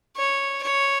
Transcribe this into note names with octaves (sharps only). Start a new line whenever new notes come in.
C#5
C#5